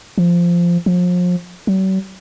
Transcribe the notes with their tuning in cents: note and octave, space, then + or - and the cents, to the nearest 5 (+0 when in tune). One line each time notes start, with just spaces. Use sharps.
F3 -10
F3 +35
F#3 +45